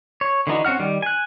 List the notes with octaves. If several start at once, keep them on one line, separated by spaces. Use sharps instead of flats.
C#5
D3 E3 D#4 F#4
C4 C#4 F#4 F#5 F6
D#3 G3
G#5 F#6